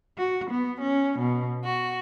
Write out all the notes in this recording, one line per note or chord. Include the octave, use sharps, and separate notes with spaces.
F#4
B3
C#4
B2
F#4